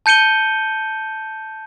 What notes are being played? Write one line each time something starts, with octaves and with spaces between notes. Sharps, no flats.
A5 G6 C#7 D#7 G7